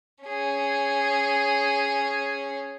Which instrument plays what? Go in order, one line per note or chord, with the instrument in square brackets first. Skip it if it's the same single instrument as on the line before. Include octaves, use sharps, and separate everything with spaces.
[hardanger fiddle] C#4 G#4